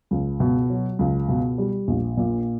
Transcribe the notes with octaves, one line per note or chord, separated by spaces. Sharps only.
C#2
B2
F#3
C#2
B2
G3
A#1
A#2